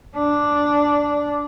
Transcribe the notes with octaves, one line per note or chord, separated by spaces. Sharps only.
D4